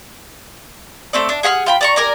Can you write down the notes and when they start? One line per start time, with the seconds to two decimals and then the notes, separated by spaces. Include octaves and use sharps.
1.13 A3 C4 D5
1.29 D4
1.43 G#4 F#5 B5 F6
1.66 F4 G5 B5
1.81 D5 A#5 C#6
1.96 A#4 D5 G#5 A#5